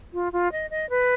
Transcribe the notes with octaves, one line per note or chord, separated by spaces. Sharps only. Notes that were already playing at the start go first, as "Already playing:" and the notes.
F4
F4
D#5
D#5
B4